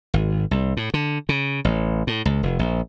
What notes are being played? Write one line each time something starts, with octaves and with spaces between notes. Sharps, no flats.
G#1
C2
A2
D3
C#3
A1
A2
C#2
F1
A#1